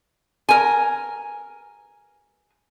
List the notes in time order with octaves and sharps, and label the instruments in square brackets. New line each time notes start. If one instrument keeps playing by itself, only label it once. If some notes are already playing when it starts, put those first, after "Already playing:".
[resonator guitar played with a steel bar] A#4 G#5